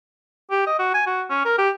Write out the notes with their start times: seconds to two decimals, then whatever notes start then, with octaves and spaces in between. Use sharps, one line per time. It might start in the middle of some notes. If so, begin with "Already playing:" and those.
0.51 G4
0.67 D#5
0.79 F#4
0.94 G#5
1.06 F#4
1.30 C#4
1.45 A#4
1.58 G4